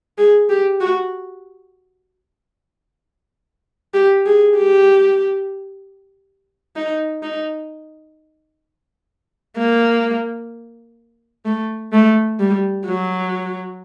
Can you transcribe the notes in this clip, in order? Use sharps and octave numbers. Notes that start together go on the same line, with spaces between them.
G#4
G4
F#4
G4
G#4
G4
D#4
D#4
A#3
A3
A3
G3
F#3